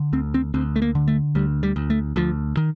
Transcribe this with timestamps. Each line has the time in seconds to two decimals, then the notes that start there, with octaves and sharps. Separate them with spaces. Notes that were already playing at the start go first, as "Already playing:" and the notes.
Already playing: D3
0.13 D2 C4
0.34 C4
0.54 D2 C4
0.76 A3
0.82 A#3
0.95 D3
1.08 A3
1.35 D2 G3
1.63 G3
1.76 D2
1.90 A3
2.16 D2 F3
2.57 D#3